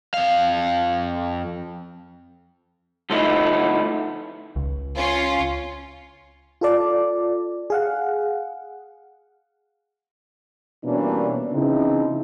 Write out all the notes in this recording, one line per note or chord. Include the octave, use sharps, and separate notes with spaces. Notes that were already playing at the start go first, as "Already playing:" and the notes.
F2 F5
D3 F3 A3 B3 D#4 E4
C#2
C#4 F4
F4 A4 D5
G#4 F5 F#5
B2 E3 G3 A#3 C#4 D4
C#3 E3 F3 C4 D#4 E4